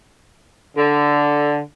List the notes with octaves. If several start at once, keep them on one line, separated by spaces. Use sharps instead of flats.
D3